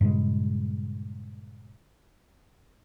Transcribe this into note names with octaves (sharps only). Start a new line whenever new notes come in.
G2 A#2 C#3 G#3